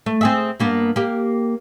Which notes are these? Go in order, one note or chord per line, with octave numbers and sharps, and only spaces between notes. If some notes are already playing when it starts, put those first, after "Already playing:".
A3
C4 G#4 E5
G2 A#3 B3
A#3 G4